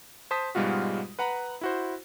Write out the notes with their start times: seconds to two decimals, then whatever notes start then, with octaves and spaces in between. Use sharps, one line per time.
0.31 C5 A5 D#6 B6
0.55 G#2 B2 G3 G#3 F4 F#4
1.19 B4 F#5 A#5 B5
1.61 E4 F#4 C5